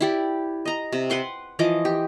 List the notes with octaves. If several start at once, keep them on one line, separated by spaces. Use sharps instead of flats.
E4 G4 D5
D#5 A#5
C3
B4 F#5 C6 D6
E3 F3 D#5 D6
G4